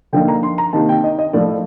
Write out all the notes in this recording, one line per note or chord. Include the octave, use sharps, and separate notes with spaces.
D3 F3 A#3 D#4 G5
A#5
C6
A#5
C3 D#3 A#3 D#4 A5
G5
D#5
D#5
A2 F3 A3 D5